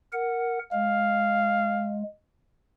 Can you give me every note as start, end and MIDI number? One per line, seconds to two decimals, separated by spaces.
0.13 0.59 70
0.13 0.59 78
0.72 2.03 56
0.72 2.01 77